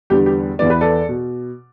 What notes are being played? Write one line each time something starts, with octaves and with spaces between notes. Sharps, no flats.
E2 D3 G3 B3 G4
G4
E2 E3 B3 D5
B4
A4 D5
B2